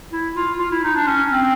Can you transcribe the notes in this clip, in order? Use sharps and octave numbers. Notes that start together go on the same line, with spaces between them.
E4
F4
F4
E4
D#4
D4
C#4
C4